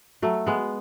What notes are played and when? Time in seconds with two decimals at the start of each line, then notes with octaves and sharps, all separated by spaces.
0.22 F#3 A3
0.47 G#3 B3